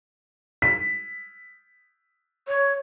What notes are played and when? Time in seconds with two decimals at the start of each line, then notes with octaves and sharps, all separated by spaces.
0.62 B6
2.48 C#5